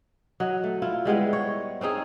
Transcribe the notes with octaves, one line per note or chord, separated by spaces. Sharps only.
F#3 D#5
A3
E4 F4
G3 G#3 B3 E4
C#5
C4 C#4 D#4 G#4